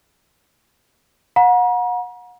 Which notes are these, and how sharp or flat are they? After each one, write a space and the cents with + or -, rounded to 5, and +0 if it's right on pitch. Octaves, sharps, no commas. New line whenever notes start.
F#5 -35 A#5 +40